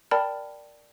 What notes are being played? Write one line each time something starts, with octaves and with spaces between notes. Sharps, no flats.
A#4 D5 G5 A5 B5 F6